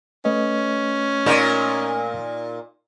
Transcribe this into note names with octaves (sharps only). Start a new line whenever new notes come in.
A3 C#4 B4 D#5
A#2 D#4 A#4